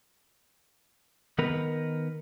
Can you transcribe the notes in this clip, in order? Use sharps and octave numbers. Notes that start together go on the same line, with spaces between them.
D#3 B3 A#4 B4